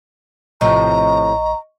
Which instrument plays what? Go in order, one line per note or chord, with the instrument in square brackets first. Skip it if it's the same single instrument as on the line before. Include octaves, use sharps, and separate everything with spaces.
[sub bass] A#1 [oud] A2 C3 F3 [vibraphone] D#5 C#6 [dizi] A#5